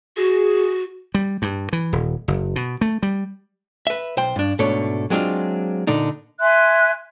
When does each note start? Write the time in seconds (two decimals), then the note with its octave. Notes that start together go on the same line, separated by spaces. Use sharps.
0.17 F#4 G#4
1.14 G3
1.42 G2
1.73 E3
1.93 D#1
2.28 F#1
2.56 B2
2.81 A3
3.03 G3
3.87 B4 E5
4.17 B1 C5 G5
4.36 G2 D4
4.59 G#2 B2 A3 D4 C#5
5.10 F#3 G#3 C4 D4 F4
5.87 A#2 D3 D4 D#4
6.40 E5 G#5 C6 F#6